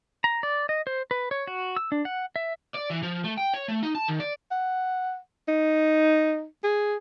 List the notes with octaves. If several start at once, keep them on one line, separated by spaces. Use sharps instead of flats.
A#5
D5
D#5
C5
B4
C#5
F#4
E6
D4
F#5
E5
D5
E3
F3
A3
G5
C#5
A3
D#4
A5
D#3
D5
F#5
D#4
G#4